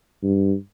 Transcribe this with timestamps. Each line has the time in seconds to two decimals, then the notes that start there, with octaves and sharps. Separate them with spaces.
0.23 G2